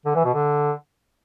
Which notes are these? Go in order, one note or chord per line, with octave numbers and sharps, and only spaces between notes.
D3
E3
B2
D3